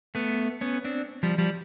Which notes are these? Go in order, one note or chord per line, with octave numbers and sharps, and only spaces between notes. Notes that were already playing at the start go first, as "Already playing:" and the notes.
A3 B3
B3 C#4
C4 D4
F3 G3
F3 G3